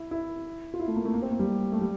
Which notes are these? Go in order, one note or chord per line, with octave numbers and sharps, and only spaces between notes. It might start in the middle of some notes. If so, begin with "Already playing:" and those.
Already playing: E4
E4
F4
E4
A3
A#3
A3
A#3
C4
A#3
G3
A3
G3